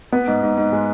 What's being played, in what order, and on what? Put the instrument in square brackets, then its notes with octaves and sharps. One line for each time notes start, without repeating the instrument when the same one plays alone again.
[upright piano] B3
G#2
G#2
G#2
G#3